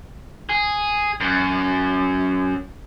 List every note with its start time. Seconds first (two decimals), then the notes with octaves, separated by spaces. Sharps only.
0.49 G#4
1.20 F#2